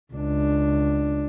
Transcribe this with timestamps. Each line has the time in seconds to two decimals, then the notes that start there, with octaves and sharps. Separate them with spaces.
0.13 C#2 D4